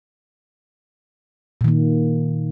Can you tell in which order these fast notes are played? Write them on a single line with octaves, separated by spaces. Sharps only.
A#2 D#3 A#3